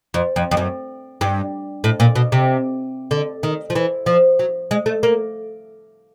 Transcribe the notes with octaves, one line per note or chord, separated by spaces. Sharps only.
F2
F2
F2
F#2
G2
A2
A#2
B2
C3
D3
D#3
F3
E3
F3
F#3
G#3
A3
A#3